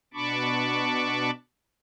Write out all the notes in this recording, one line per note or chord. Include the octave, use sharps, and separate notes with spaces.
B2 D4 A5 B5 C#6 D6